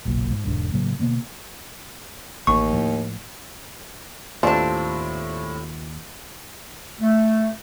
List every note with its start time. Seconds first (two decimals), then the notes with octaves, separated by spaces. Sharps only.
0.05 F#1 B1 A#2
0.31 G#2
0.46 E1 A#1 G#2 D3
0.73 A2 C#3 F#3 A#3
0.99 B2 D3 A#3 B3
2.47 A1 D#2 C#6
2.73 A2 F3
4.43 D#2 A2 C4 D4 F4 A5
7.01 A3